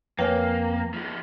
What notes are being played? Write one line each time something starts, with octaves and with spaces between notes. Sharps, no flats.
F2 A#3 B4 C#5 F5 G5 G#5
F3 G#3